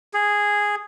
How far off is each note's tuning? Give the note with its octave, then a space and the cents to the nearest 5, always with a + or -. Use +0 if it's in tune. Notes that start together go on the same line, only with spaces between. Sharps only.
G#4 -5